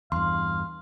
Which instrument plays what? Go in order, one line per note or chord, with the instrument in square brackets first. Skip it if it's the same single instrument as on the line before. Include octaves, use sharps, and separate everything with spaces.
[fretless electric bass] E2 G2 [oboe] F5 [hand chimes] C6